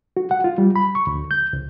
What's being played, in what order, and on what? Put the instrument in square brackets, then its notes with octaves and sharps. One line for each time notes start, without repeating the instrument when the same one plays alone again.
[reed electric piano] F#4
F#5
F4
G3
B5
C#6
D2
G6
C#2